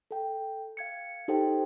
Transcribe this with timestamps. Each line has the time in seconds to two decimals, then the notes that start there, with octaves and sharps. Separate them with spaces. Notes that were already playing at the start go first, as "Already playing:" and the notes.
0.11 A4 G5
0.77 F5 G#6 C#7
1.28 D#4 G4 A4 C5 G5